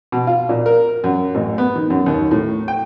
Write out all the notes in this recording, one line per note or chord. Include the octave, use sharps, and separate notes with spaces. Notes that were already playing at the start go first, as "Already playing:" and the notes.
B2
F4
A#2
A#4
F#2
A1
B3
D#3
F#2
D#2
A2
G5